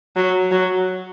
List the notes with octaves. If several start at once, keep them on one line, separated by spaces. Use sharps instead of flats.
F#3
F#3